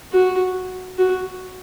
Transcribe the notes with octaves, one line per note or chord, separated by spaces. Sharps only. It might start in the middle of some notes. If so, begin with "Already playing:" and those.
F#4
F#4